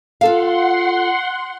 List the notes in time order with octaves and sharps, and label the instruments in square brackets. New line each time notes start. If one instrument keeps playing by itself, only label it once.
[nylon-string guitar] F4 A4 F5 [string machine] F#5 C6